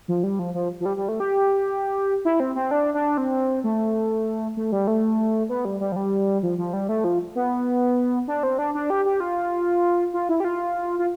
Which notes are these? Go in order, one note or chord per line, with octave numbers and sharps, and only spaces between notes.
F3
G3
F3
F3
F3
G3
G3
A3
G4
E4
C4
C4
D4
D4
C4
A3
A3
G3
A3
B3
G3
G3
F3
G3
F3
F3
G3
A3
F3
B3
D4
C4
D4
D4
G4
G4
F4
F4
E4
G4
F4
F4